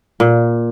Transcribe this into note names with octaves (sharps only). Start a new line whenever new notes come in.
A#2